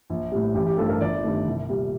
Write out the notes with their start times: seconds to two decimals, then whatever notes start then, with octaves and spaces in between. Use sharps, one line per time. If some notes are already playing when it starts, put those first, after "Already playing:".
0.10 A#1
0.32 A2 G3
0.54 A1 G4
0.66 G4
0.78 G2 F3 A3 A4
0.89 A#4
1.01 G1 D5
1.24 G2 D#3 A3
1.47 C2
1.69 A#2 G3